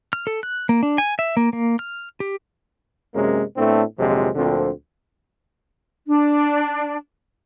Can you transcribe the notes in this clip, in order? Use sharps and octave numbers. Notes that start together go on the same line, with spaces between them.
F6
A4
F#6
A#3
D4
G#5
E5
A#3
A#3
F6
G4
F#2 C3 G#3 A#3 C#4
A2 A3 B3 C4 D4
A#1 F2 C3 D#3 F#3 G#3
D2 A#2 D3 F3 C4
D4